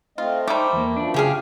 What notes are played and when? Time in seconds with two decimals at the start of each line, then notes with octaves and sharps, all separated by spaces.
0.18 A3 C4 F4 D#5
0.48 G3 A3 D#4 C5 D6
0.73 E2 A#3
0.96 F#2 F3 D4 D5
1.14 C#3 G4 G#4 F5